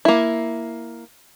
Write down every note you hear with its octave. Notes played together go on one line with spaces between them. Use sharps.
A#3 E4